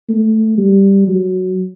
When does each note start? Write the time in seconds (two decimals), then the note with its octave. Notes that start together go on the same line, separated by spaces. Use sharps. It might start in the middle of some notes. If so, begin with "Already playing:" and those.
0.09 A3
0.58 G3
1.08 F#3